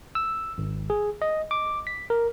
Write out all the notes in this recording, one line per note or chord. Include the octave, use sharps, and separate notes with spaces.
E6
G#1
G#4
D#5
D6
B6
A#4